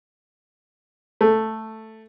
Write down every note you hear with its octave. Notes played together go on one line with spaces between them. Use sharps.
A3